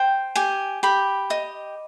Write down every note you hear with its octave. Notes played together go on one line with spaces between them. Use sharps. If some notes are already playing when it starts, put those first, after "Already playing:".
Already playing: C5 G5
G4 G#5
G4 B5
D#5